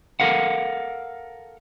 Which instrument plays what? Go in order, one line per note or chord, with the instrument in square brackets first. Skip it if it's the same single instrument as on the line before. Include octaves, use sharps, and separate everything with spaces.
[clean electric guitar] A4 A#4 F5 F#5